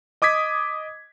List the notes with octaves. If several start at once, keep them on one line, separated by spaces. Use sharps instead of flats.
D#5 D6 D#6 G#6 B6